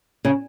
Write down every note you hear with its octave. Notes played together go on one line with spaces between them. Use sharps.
C#3